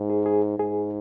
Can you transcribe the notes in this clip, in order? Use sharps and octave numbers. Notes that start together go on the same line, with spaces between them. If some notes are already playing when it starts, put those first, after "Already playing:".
Already playing: G#2
G#4
G#4
G#2 G#4